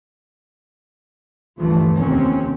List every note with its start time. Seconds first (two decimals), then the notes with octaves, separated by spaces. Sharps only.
1.58 D2 G2 E3 F3 A3
1.96 F1 D#2 C4 C#4